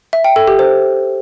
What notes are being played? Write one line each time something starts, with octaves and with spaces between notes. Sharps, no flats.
E5
G5
A4
G4
C5